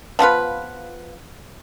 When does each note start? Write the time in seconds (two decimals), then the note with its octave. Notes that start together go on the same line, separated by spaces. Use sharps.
0.19 F3 B3 F4 B4